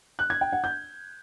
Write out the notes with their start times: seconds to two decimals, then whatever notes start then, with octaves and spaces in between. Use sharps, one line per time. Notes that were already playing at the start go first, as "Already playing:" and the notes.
0.19 F#6
0.30 G#6
0.41 G5
0.52 F#5
0.64 G6